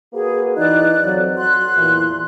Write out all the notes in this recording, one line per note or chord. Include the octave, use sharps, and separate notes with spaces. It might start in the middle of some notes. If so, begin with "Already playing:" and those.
A#3 F#4 G#4 B4
E3 D#4 D5 F#6
F2 F#3
F#4 C6 F#6
E2 A#2 E3